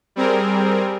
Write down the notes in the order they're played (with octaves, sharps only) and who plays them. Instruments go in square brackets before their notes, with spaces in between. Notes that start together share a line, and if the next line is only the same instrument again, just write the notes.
[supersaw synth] G3 C4 G#4 A#4